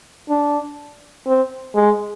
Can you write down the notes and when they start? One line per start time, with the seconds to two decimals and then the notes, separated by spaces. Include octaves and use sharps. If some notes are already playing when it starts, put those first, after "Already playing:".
0.30 D4
1.27 C4
1.75 G#3